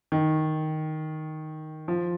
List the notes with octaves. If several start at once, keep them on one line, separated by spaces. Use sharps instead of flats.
D#3
F3